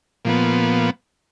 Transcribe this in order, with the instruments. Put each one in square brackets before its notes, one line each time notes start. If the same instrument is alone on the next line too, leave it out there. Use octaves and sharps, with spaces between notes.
[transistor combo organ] A#2 F3 B3